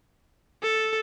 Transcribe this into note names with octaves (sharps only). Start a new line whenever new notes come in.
A4